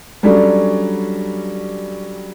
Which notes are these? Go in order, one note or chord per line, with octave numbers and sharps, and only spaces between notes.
F#3 G3 C#4 D4 A4